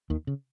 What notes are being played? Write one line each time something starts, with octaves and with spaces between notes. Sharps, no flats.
D#2 D#3
C#3